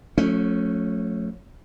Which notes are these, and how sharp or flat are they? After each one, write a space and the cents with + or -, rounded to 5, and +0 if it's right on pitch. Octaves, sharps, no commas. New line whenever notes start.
F3 +45 A3 +0 C#4 +0